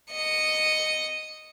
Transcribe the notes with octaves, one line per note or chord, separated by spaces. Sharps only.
D#5 C#7